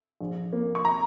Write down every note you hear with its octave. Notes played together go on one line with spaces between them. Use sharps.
A#1
A#3
C#6
A#5